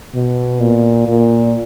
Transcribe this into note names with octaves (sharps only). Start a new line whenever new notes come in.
B2
A#2
A#2